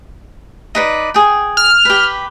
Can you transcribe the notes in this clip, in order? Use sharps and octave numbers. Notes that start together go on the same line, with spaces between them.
D#4 B4 D5
G#4 G5
F6
G4 B4